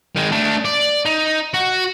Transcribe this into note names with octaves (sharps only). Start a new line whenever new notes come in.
D#3 G#3
A3 D4
D5
D#4
F#4